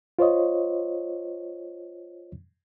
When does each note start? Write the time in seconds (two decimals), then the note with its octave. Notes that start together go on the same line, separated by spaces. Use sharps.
0.19 F4 C5 C#5 D#5